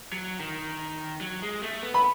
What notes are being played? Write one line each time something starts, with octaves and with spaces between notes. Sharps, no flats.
F#3
D#3
F#3
G#3
A3
B3
B5